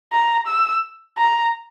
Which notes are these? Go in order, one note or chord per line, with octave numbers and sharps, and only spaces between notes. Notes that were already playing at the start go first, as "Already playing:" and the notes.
A#5
E6
A#5